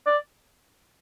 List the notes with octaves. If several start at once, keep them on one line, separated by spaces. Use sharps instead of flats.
D5